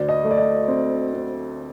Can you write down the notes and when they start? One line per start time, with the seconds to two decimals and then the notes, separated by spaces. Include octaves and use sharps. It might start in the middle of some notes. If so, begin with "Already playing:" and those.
Already playing: D2 D5
0.09 D#5
0.24 A3
0.31 D5
0.38 D#5
0.68 C4
1.14 C4